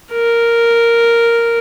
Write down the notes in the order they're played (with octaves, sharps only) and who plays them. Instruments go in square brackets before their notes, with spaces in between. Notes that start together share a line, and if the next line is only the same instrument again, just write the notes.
[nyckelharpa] A#4